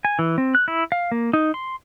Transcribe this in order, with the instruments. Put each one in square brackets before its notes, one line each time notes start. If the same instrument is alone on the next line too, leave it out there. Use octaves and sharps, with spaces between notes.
[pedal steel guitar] G#5
E3
C4
F#6
E4
F5
A#3
D#4
C6